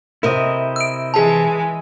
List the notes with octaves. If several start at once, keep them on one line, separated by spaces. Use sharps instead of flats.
C3 E4 A#4 D#5
E6 D7
E3 G#3 G#4 A5